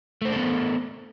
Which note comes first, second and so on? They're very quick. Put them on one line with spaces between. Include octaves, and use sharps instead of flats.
A3 C5 D4 A4 B3